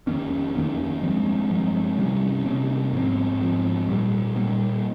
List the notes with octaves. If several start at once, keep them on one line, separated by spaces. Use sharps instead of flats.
F2 D#3 A#3 C#4
F2 D#3 A#3 C#4
G2 F3 G#3 C4
G2 F3 G#3 C4
C3 G3 A#3 C#4
C3 G3 A#3 C#4
G#2 F3 C4
G#2 F3 C4
A#2 G3 A#3
A#2 G3 A#3